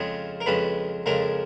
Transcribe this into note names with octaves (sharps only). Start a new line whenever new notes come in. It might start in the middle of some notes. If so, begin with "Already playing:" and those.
Already playing: F2 C#3 F3 G#3 C#5
A#4
F2 C#3 F3 G#3 B4
F2 C#3 F3 G#3 A#4